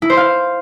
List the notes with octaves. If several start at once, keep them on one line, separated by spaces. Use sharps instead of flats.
E4
C5
F5